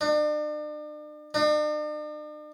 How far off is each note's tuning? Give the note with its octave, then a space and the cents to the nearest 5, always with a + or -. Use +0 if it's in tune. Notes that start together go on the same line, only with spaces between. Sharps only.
D4 +40
D4 +45